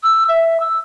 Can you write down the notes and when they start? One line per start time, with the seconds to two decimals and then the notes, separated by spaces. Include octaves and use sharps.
0.03 E6
0.28 E5
0.60 E6